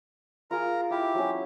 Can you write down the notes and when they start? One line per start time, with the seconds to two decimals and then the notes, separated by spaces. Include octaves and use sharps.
0.51 F4 G#4 A#4 A#5
0.91 E4 G4
1.15 F#3 C#4